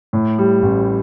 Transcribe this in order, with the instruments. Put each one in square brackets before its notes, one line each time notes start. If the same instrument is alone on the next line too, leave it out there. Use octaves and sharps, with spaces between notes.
[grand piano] A2
G3
A1